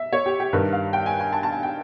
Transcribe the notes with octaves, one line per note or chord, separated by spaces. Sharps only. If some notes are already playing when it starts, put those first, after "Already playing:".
Already playing: E5
C#5
G4
G4
G2 D#3 G3 B4
F5
G5
G#5
G#5
A5
A5
G#5
G5